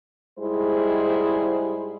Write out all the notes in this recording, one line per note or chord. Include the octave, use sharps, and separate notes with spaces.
G#2 G3 G#3 E4 G#4 C5